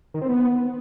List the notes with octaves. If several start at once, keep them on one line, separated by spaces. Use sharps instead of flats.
D#3
C4
B3